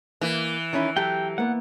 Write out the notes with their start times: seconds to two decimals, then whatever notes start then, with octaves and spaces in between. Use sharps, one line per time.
0.21 E3 A#3
0.73 D#3 C#4 E4
0.97 F#3 G4 A4 G5
1.38 A#3 B3 F#5